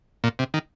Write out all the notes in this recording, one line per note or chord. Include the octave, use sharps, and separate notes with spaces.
A#2
C3
D#3